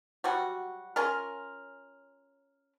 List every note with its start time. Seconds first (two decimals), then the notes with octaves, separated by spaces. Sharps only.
0.24 F#3 G3 F#4
0.96 C#4 F4 A#4